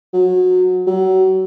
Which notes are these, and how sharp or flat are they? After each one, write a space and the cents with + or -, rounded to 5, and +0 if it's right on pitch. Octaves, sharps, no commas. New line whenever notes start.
F#3 -20
F#3 +25